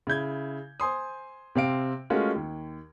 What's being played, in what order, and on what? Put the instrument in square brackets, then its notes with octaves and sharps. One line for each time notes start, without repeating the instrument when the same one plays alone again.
[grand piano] C#3 E4 G6 G#6
C5 G#5 C6 D#6
C3 C4 F5 D7
G#3 A3 C#4 F4 F#4 A#4
D#2